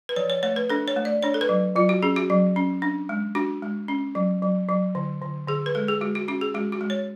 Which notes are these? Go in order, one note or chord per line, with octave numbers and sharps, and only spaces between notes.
B4
F3 C#5
C#5
A3 C#5
B4
D4 A4
C#5
A3
D5
D4 C#5
A4
B4
F#3
F#3 F4
F#4
C#4 G#4
F#4
F#3
C#4
D4
G#3
D4 F#4
G#3
C#4
F#3
F#3
F#3
D3
D3
D3 G#4
B4
G#3 A4
G#4
G#3 F#4
F#4
C#4 F#4
G#4
G#3 F#4
F#4
G#3
C#5